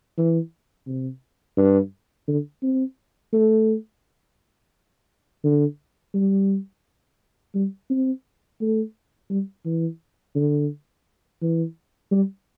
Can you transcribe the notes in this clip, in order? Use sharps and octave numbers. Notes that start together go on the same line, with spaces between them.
E3
C3
G2
D3
C4
A3
D3
G3
G3
C4
A3
G3
E3
D3
E3
G3